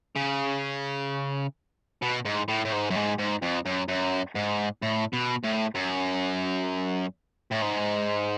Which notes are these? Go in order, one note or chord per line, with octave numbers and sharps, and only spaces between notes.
C#3
B2
G#2
A2
A2
G#2
F#2
G#2
G#2
F2
F#2
F#2
G#2
A2
B2
A2
F#2
A2
G#2